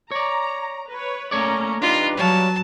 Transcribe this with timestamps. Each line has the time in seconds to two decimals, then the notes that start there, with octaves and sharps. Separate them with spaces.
0.11 C#5 D5 A#5
0.90 B4 C#5
1.31 A3 A#3 C#4 C#5 D5 A#5
1.82 D4 D#4 F4 G4 B4
2.17 F#3 G3 C#5 F5 A5